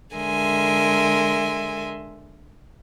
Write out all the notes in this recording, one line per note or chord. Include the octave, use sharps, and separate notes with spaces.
D3 G#3 A#4 E5 G#5 C6